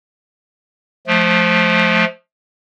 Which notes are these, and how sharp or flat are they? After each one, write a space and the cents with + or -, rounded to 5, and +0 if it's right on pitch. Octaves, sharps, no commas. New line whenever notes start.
F3 +10 A3 -25